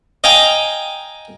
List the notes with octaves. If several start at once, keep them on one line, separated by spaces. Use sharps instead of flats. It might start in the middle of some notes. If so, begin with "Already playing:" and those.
D#5 F5 G5 G#5 A#5